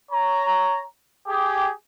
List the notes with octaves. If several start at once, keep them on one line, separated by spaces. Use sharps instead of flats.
C#5 A#5
G4 G#4